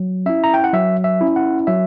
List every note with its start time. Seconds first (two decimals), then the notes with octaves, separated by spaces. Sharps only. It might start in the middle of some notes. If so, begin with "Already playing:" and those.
Already playing: F#3
0.26 C#4 E4 E5
0.44 A#5
0.54 G5
0.64 F#5
0.73 F#3 E5
1.04 E5
1.21 C#4 E4
1.36 F#5
1.67 F#3 E5